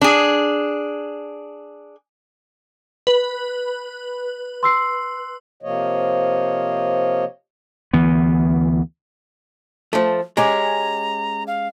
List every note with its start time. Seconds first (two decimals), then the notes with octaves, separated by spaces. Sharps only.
0.02 D4 G#4
3.07 B4
4.63 C6 E6 C7
5.63 C3 F3 A#3 C#5 D#5
7.93 D2 E3 B3
9.93 F3 A3
10.37 G#3 C#4 G4 A#5
11.47 F5